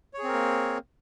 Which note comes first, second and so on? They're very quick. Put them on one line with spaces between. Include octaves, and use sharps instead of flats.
C#5 G#4 C4 A#4 A#3